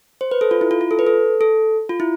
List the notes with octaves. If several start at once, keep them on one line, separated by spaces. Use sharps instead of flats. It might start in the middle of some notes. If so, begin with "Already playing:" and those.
C5
B4
A4
F4
E4
F4
F4
A4
B4
A4
A4
F4
E4